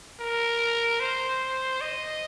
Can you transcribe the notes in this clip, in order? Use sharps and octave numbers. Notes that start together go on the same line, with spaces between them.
A#4
C5
D#5